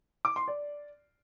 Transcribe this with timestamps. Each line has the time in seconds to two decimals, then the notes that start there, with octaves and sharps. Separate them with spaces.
0.25 D6
0.36 C6
0.48 D5